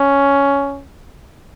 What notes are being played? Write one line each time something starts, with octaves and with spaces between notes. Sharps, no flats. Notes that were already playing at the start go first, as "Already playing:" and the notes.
Already playing: C#4